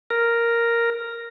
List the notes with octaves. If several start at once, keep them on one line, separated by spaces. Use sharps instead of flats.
A#4